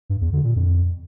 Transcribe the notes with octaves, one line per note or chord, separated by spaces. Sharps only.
G2
E2
D3
A#2
F2